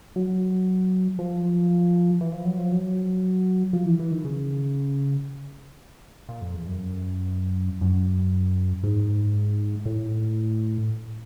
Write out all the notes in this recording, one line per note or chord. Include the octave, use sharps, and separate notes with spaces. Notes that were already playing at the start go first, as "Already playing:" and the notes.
F#3
F3
E3
F3
F#3
F3
F#3
F3
E3
E3
D#3
C#3
A#2
F2
E2
F#2
F#2
G#2
A2